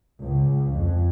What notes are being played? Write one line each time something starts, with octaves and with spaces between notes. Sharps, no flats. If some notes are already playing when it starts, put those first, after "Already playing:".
C#2
F2